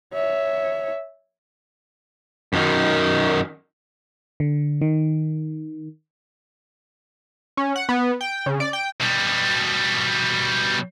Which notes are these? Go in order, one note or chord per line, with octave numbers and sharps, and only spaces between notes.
C#5 E5
F#2 D#3
D3
D#3
C#4
F#5
B3
G5
C#3
D5
G5
B2 G3